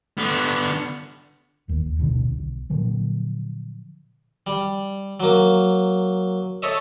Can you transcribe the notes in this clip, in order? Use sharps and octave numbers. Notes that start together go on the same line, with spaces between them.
D3 B3
F1 D#2
D1 G#1 B2 D3
B1
A#2 D3 F3 F#3
G3
F#3 A#3
A4 C#5 D#5 E5